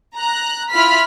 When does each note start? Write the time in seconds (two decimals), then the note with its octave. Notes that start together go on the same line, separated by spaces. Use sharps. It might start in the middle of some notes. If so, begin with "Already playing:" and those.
0.16 A#5 F#6
0.71 E4 F4 B5 F6 B6